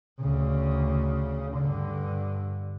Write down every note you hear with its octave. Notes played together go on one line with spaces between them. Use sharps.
D2 C#3
G2 D3